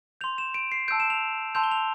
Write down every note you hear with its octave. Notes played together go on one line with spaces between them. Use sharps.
C6 G6 F7
E7
D7
C7
A5 E6 G6 D7
E7
F7
A5 C6 E6 G6 F7
G7
F7